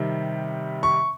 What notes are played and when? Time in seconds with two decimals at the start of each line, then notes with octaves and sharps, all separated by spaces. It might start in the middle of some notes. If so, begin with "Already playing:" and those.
Already playing: C3 D#3 G3
0.83 C#6